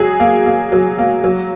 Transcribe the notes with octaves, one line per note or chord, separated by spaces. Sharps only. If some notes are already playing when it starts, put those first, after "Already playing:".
Already playing: F#3 G#4
A#3
A#3
F#3
A#3
F#3